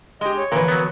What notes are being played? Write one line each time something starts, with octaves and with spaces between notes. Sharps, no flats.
G#3 G4 D#5
C#5
A#2 D3 E3 F3 A#4 B4
F#3 B3